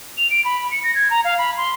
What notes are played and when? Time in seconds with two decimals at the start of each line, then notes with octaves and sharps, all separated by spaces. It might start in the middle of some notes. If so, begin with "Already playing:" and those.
0.17 F7
0.30 D7
0.45 B5
0.71 C#7
0.84 A#6
0.95 G#6
1.10 A#5
1.25 F5
1.38 B5
1.57 C6